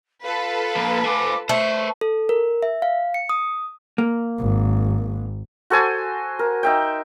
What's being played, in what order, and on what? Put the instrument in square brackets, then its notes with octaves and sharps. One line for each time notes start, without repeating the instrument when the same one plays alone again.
[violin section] F4 A4 B4 [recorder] F5
[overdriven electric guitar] F3 A#3
[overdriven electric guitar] C5 G#5 [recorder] D6
[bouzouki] A3 [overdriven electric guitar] B4 C5 [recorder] C#6
[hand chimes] A4
A#4
E5
F5
C#7
D#6
[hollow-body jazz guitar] A#3
[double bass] G#1
[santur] F#4 A4 C5 G#5
A#4
D#4 E5 G5